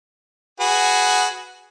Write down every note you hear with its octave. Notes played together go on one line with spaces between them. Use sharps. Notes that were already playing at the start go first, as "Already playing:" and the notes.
F#4 G#4 B4